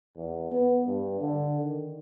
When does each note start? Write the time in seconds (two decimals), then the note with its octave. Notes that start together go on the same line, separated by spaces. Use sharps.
0.17 E2
0.52 B3
0.87 G2
1.21 D3
1.62 D#3